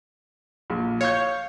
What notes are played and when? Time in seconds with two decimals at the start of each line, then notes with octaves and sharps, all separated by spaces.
0.70 A#1
1.01 C#5 F5 C#6 G6